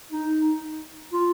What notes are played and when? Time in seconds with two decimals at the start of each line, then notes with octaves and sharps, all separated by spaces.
0.12 D#4
1.13 F4